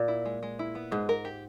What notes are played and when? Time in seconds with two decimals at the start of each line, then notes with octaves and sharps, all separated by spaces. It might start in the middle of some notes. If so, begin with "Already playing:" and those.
Already playing: A#2
0.08 E4
0.26 G#3
0.43 G#3
0.59 E4
0.75 B3
0.92 G#2 G#3
1.09 A#4
1.25 G4